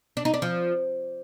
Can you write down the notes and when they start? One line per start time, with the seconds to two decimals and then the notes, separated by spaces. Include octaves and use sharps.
0.17 D4
0.25 D#4
0.34 D4
0.42 F3